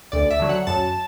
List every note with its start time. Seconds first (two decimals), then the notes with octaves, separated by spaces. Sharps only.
0.12 D2 D5
0.31 E5
0.40 D3 F#3
0.49 F#5
0.67 F#2 A5